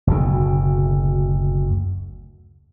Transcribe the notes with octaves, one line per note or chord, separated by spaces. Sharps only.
F#1 D2 B2